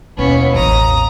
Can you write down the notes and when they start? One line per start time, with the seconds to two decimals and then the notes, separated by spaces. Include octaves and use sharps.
0.17 D#2 B2 B3 C#4 E4
0.55 A1 E2 A#5 D#6